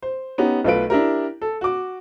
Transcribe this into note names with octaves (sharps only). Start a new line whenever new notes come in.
C5
B3 C#4 D#4 G4
B1 A3 F4 B4 D7
D4 E4 G4 A#4
A4
F#4 D6